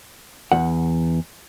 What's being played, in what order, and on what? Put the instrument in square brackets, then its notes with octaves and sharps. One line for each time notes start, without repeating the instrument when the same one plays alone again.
[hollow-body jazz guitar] E2 F#5